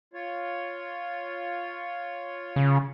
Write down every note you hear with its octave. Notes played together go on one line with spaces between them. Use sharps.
F4 C#5
C#3